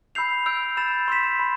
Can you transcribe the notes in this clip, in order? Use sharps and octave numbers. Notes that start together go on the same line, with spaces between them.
B5 E6 G6 C7 F7
E6 G6 D7 F7
B5 E6 A6 E7
C6 E6 B6 E7
B5